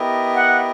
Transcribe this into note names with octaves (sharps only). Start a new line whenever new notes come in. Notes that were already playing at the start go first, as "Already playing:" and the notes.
Already playing: B3 E4 G4 A#4 D#5
F#5